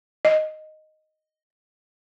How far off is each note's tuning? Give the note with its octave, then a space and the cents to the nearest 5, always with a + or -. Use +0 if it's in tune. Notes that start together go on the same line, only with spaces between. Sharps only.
D#5 -5